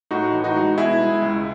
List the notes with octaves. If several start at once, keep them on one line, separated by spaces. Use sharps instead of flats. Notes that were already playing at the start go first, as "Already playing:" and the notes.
A2 D#4 F#4
E3
D#4 F#4
G#3
B2 E4 G#4
G#3
C#2